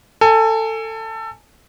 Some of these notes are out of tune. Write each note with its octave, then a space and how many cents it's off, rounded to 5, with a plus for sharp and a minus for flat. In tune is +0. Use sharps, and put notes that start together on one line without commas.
A4 +20 G#5 +0